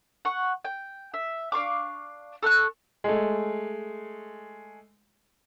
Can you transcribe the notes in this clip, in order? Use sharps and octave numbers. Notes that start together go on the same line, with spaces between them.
F#5 C#6
G5
E5
D4 F5 C#6 D6
A4 C#6 F6 F#6
G#3 A3